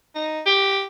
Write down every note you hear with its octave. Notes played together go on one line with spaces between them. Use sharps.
D#4
G4